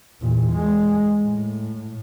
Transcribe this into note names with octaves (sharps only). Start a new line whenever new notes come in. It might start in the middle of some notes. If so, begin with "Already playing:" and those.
E2 A#2
G#3
A2